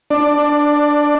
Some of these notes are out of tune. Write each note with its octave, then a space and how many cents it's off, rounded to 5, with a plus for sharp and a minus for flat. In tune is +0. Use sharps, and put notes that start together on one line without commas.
D4 +0 D5 +20